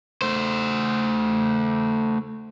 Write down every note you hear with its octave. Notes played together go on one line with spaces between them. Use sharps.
A3 C5